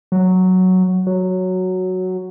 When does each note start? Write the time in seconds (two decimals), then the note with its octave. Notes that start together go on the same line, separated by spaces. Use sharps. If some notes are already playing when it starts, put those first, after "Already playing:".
0.12 F#3
1.07 F#3